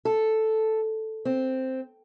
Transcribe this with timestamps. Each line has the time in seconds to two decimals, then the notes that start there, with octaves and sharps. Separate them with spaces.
0.05 A4
1.25 C4